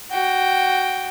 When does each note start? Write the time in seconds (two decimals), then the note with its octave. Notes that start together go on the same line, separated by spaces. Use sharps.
0.11 F#4 G5